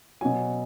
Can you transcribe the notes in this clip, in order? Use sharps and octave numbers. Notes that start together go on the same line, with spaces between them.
B2 F#3 G#5